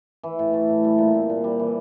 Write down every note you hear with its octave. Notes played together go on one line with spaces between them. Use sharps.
E3
A2
A3
A2
G3
A#2
C4
A#2
G3
E3